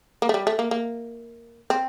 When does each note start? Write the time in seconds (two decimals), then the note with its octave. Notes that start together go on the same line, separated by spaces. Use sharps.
0.22 A#3
0.29 A3
0.34 G3
0.47 A3
0.59 A#3
0.71 A#3
1.70 C4